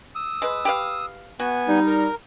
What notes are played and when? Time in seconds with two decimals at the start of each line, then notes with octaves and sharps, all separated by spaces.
0.15 D#6 E6
0.42 G#3 B4
0.65 G4 B4 F5
1.40 B3 F#4 G#5
1.67 G3 D#4
1.87 A#4